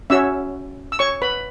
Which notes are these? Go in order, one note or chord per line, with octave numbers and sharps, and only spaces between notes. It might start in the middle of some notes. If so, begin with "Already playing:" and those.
C#4 F#4 C#5 E5 E6
E6
C#5 C#6
B4 B5